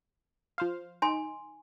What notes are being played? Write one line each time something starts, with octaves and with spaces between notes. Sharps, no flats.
F3 C5 F5
D#4 G#5 C6